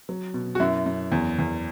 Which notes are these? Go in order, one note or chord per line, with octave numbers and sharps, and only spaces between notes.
F#3
B2
F#4
F#2 E4
F#2
E2
E2